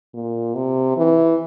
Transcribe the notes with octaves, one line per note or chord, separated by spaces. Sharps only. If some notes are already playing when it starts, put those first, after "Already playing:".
A#2
C3
E3